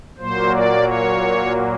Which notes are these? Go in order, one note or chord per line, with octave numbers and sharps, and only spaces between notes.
A#2 F#3 A#3 C5
D5
C#5